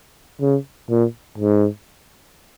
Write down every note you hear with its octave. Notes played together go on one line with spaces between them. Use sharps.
C#3
A#2
G#2